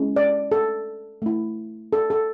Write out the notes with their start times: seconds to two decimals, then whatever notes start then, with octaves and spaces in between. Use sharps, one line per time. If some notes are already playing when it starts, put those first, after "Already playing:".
Already playing: G#3 C#4 E4
0.16 D5
0.52 A4
1.22 A3 E4
1.93 A4
2.10 A4